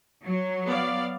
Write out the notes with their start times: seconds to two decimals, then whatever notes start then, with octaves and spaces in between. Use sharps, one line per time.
0.25 F#3
0.66 B3 D5 F5